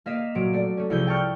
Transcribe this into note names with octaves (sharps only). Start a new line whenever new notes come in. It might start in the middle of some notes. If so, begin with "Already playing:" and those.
A#3 A#4 D#5 F5 B6 E7
A#2 F#3 D7
A3 D5
A3 C#4
C2 F3 E4 G#4 G6
G5 A5 C#6 F6 G6